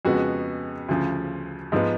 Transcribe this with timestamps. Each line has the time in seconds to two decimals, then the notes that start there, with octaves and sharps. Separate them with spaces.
0.05 F2 C#3 G#3 B3 F#4
0.89 D2 C#3 F3
1.72 G#2 F3 G#3 B3